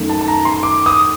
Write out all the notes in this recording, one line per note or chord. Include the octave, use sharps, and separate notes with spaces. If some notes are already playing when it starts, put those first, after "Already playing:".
Already playing: F#2 D#3 A3 D#4
A5
A5
A#5
C6
D6
D#6